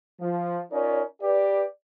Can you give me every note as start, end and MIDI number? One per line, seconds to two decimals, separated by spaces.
0.21 0.61 53
0.72 1.02 61
0.72 1.02 63
0.72 1.02 65
0.72 1.02 70
0.72 1.02 73
0.72 1.02 74
1.22 1.64 67
1.22 1.64 71
1.22 1.64 74